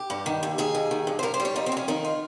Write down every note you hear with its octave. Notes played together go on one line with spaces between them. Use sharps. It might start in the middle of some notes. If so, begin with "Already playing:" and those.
Already playing: G4
G2
D#3
D#2
D#3 G#4
D#2
D#3
G2
C5
G2 A#4
C5
G3
C#5
F2 D#4
C4
F2 C#4
D#3 D#4
F4